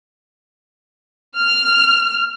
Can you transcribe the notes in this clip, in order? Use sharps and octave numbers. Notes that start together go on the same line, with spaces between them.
F6